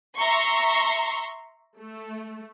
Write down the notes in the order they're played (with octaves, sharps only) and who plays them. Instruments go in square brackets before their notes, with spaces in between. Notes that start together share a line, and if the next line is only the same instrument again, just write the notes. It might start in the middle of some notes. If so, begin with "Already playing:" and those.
[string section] E5 A#5 C6 C#6
A3